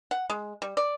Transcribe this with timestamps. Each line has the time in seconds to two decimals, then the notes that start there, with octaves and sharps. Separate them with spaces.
0.11 F#5
0.30 G#3
0.62 G3
0.77 D5